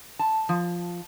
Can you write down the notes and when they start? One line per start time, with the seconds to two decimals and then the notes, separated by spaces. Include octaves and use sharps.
0.19 A5
0.49 F3